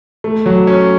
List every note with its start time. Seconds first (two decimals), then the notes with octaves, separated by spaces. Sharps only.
0.24 A3
0.46 F#3
0.67 C#4